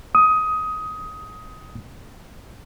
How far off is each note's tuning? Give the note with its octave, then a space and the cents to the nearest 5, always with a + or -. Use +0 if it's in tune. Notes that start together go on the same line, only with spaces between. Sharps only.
D#6 +15